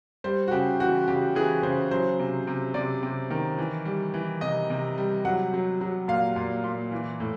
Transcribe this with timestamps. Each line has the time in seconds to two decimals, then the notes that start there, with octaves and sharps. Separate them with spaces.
0.24 G3 C5
0.48 F#4
0.51 C#3 G4
0.80 E3 F#4
1.08 C#3 G4
1.35 E3 G#4
1.63 C#3 C5
1.91 F#3 C5
2.19 C3
2.47 C3
2.74 C3 D5
3.03 C3
3.31 D#3
3.58 E3
3.85 G3
4.14 E3
4.41 C3 D#5
4.70 C3
4.98 G3
5.25 F#3 F#5
5.54 F#3
5.81 F#3
6.08 A#2 F5
6.36 A#2
6.64 A#2
6.92 E3
7.20 A2